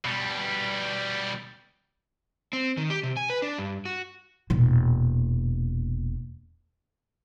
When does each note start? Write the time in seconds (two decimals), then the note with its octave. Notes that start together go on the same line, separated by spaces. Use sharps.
0.05 B2 G3
2.53 C4
2.77 D#3
2.90 G4
3.03 C3
3.17 G#5
3.30 B4
3.42 D4
3.58 G2
3.85 F#4
4.50 E1 A#2